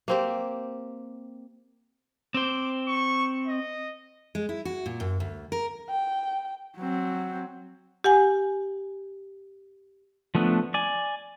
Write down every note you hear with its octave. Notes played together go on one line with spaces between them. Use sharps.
A#3 C4 G4
C4 C5 D6
C#6
D#5
G#3
E4
F#4
A#2
F#2
D2
A#4
G5
F#3 C4
G4 F#5 G#5
F3 A3 B3 D4
D5 G#5